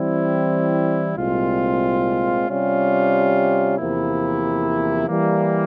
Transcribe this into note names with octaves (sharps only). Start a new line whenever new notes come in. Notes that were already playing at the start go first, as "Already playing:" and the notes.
Already playing: E3 G3 C4 E4
C2 A#2 G#3 C4 F4
C3 G3 C#4 F4
E2 C3 F3 A#3 E4
E3 G3 A#3